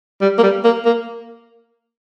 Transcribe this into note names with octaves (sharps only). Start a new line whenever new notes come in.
G3
A#3
G3
A#3
A#3